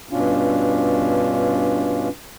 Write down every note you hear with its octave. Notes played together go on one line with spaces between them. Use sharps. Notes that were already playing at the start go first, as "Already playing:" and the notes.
G2 B2 C#4 D4 F4